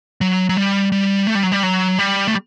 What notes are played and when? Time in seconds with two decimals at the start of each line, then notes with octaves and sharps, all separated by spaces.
0.21 F#3
0.49 F#3
0.57 G3
0.92 G3
1.27 A3
1.35 G3
1.43 F#3
1.52 G3
1.63 F#3
1.99 G3
2.28 A3